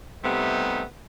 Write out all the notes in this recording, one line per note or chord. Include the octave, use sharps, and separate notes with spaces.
C3 G3 A3 B3 D#4